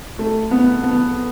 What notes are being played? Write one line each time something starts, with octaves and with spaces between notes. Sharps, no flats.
A3
B3
B3